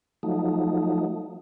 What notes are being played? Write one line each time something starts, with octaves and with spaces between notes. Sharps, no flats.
F3 F#3 A3 D#4